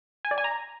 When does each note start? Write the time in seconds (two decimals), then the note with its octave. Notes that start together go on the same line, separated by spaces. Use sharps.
0.25 G#5
0.31 D5
0.38 G#5
0.44 A#5